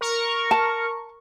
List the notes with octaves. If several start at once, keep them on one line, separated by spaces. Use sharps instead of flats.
A#4 C#6
A5